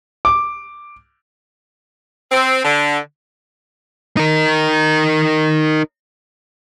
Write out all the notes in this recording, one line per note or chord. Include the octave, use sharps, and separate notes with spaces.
D6
C4
D3
D#4 A#4